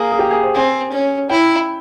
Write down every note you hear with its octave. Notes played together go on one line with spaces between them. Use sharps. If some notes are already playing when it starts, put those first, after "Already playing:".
Already playing: A#3 G#4
G#4
G4
G#4
C5
C4 G#5
C#4
E4 G5